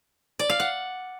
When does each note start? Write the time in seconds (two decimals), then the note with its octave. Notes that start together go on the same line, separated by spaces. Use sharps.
0.39 D5
0.50 F5
0.60 F#5